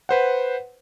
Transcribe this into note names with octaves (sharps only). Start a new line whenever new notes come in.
B4 C5 F#5